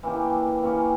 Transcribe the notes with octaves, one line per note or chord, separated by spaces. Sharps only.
E3 A#3 C#4 G4
E3 A#3 C#4 G4